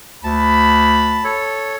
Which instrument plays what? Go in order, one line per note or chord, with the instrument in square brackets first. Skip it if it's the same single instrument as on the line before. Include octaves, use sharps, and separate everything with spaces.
[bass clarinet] D2 [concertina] A5 [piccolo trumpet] B5
[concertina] A4 C#5